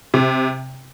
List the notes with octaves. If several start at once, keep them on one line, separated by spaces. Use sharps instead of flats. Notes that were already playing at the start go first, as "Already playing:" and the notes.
C3